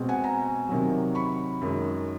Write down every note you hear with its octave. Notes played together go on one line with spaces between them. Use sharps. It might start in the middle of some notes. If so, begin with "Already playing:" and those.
Already playing: B2 G#3 C4
F#5 G#5
G#5 A#5
C3 D#3 F#3
B5 C#6
F#2 D#3 G#3